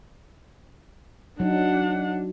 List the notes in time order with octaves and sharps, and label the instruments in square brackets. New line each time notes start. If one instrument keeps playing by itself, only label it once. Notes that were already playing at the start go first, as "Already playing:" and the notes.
[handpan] F#3 D#4 [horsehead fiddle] D4 F#5